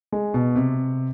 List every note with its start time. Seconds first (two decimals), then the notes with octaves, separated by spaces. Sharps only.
0.12 G#3
0.34 B2
0.56 C3